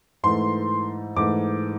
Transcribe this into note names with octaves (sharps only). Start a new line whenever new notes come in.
G#2 E3 A3 C6
G#2 E3 A3 D6